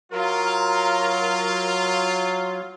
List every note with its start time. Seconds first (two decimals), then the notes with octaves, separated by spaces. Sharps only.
0.13 F#3 F4 A#4